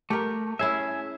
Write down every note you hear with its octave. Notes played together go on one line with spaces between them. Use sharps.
A3 G4 A#4
C#4 E4 G#4 E5